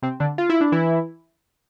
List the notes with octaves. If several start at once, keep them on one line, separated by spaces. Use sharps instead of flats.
C3 C4
D3 D4
F4
E4
D4
E3 E4